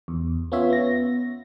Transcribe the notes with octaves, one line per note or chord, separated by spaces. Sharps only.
E2
B3 C#4 F4 C#5 E5
B3 A#6